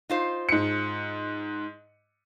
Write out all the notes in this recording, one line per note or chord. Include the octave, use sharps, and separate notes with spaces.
D#4 F4 C5
G#2 C#7